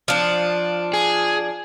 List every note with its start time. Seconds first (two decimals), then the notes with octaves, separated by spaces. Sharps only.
0.08 F3 D4
0.93 G#4